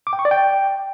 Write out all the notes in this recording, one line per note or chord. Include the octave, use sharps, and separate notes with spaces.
D6
G5
C#6
D5
G5